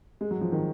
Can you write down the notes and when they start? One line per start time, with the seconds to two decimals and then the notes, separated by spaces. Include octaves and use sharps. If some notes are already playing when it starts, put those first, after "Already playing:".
0.21 G#3
0.31 F#3
0.41 F3
0.52 D#3